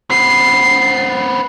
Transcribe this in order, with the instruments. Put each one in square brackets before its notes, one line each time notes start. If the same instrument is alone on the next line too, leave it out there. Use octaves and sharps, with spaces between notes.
[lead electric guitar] B3 C4 [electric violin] C7